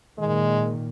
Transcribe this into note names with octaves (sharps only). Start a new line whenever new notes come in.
A#2 D#3 G#3